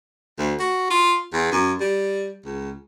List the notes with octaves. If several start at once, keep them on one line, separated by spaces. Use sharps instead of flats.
D2
F#4
F4
E2
F#2
G3
C#2